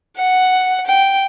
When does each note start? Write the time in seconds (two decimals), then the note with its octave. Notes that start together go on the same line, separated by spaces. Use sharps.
0.17 F#5
0.86 G5